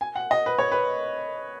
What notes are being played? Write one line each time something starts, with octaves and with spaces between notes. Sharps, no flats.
G#5
F#5
D#5
B4
C#5
B4